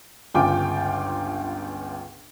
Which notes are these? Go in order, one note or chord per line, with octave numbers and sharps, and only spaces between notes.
G1 C#2 F4 G5 G#5 D6